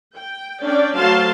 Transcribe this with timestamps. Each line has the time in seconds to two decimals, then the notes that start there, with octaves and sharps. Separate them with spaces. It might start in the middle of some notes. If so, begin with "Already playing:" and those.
0.16 G5
0.62 C#4 D4 D5 G5
0.97 F#3 A3 C5 F5 A5 C6